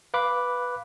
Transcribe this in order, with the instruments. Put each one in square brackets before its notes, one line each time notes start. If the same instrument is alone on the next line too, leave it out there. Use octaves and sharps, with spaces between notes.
[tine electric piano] B4 F5 B5 D6 F#6